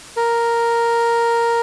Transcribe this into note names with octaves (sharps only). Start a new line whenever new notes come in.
A#4